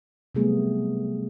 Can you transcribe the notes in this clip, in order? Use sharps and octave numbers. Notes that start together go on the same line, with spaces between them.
C3 F#3 G3 A3 B3 G#4